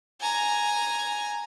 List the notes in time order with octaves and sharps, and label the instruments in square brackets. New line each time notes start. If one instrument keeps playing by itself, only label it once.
[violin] G#5 A#5